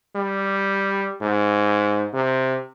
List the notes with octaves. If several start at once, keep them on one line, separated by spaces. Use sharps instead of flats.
G3
G#2
C3